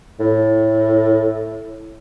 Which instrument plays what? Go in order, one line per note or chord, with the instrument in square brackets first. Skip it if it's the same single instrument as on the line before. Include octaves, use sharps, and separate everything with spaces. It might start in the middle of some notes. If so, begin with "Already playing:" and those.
[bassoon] A2